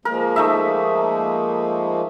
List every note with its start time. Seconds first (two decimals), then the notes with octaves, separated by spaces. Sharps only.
0.05 F3 G#3 A#3 A#4
0.36 A3 D#4 E5